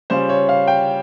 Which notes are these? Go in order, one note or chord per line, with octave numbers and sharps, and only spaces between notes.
C#3 G3 C#4 F4 C5
C#5
F5
G5